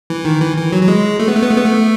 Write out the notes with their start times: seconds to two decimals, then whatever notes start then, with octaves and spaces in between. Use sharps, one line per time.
0.10 E3
0.25 D#3
0.41 E3
0.57 E3
0.72 F#3
0.83 F#3
0.88 G#3
1.20 A3
1.28 B3
1.35 A3
1.42 B3
1.50 A3
1.57 B3
1.65 A3